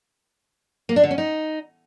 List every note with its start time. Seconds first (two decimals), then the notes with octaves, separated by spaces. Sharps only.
0.89 A#3
0.96 D4
1.03 D3
1.11 C#4
1.18 D#4